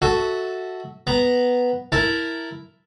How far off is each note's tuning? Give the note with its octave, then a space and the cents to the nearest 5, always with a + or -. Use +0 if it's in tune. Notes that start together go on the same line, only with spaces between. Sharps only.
F#4 +0 A4 +0 E5 -20
B3 +0 A#5 +0
E4 +0 A#4 +0 A5 +0